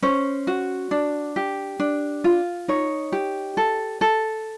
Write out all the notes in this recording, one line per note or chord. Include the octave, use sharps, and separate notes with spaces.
C#4 C5
F#4
D4
G4
D4
F4
D#4 C#5
G4
A4
A4